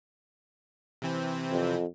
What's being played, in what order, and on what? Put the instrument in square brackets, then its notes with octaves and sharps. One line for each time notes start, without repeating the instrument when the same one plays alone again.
[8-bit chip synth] C3 E3 C4
[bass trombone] F2